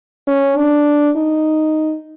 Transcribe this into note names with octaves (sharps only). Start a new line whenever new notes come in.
C#4
D4
D#4